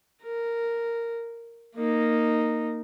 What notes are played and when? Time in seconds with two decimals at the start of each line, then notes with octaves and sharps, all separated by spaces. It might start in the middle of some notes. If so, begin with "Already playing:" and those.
0.23 A#4
1.76 A#3 D#4